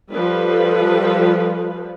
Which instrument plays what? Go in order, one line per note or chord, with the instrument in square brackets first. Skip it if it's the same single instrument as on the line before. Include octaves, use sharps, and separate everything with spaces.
[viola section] F3 G3 A4 B4